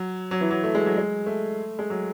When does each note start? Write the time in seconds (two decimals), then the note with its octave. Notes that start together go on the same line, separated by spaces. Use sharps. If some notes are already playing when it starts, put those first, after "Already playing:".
Already playing: F#3
0.31 F#3
0.41 E3
0.50 F#3
0.64 A3
0.75 G#3
0.86 F#3
0.97 G#3
1.26 A3
1.79 G#3
1.90 F#3